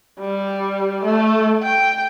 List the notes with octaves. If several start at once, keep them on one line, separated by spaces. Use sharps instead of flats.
G3
A3
G5